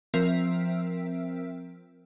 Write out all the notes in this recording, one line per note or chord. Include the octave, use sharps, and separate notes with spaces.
F3 C4 A#4 E5 E6 B6